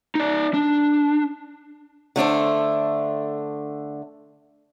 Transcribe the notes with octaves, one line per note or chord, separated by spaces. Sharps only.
D#4 D5
D4
D3 A3 D4 C5